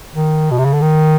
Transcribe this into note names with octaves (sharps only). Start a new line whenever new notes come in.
D#3
B2
C3
C#3
D3
D#3